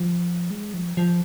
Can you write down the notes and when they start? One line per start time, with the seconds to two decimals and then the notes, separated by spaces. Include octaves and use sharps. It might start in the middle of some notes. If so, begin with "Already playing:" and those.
Already playing: F3
0.51 G#3
0.74 F3
0.97 F3